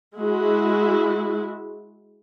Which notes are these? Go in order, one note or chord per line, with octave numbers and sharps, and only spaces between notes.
G#3 E4 F#4